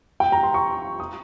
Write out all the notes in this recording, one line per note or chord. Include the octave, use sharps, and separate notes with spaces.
G5
A#5
C6
C#6
D#6